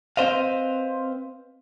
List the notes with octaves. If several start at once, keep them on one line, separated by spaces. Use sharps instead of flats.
C4 B4 C5 D#5 F5